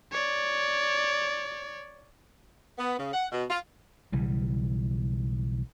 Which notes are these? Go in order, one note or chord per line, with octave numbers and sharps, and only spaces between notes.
C#5 D5
B3
C#3
F#5
B2
F4
B1 C#3 E3 G3